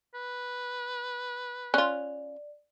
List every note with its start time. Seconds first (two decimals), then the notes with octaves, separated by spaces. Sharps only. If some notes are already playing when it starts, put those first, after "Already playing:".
0.14 B4
1.74 C#4 F4 D5 F#6